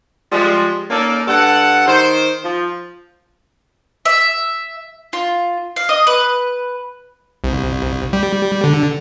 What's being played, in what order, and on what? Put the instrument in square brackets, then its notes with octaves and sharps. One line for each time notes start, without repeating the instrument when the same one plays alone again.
[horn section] F3 G3 G#3
A#3 C#4 D#4 A4 D5
G2 A4 F#5
D#3 C5
F3
[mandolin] E5
F4
F5
D#5
B4
[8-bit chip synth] C2
G3
D3